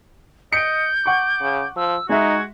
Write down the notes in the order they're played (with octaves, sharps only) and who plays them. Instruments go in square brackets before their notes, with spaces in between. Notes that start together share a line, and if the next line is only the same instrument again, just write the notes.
[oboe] D#5 [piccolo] G6 [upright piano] C#7 D7
[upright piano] F#5 C#6 [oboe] D6
[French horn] C#3
[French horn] F3 [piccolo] E6
[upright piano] G#3 E5 [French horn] D#4 [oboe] F#4 [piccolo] G#6